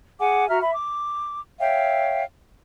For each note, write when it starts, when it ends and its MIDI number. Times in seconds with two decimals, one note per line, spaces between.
0.19 0.47 68
0.19 0.47 78
0.19 0.47 80
0.19 0.47 86
0.49 0.58 66
0.49 0.58 76
0.49 0.58 82
0.49 0.58 89
0.61 0.73 76
0.61 0.73 83
0.73 1.40 86
1.59 2.23 73
1.59 2.23 76
1.59 2.23 77
1.59 2.23 79